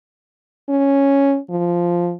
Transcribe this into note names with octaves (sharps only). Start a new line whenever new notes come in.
C#4
F3